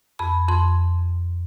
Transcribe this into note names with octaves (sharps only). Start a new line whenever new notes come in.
F2 B5
F2 C6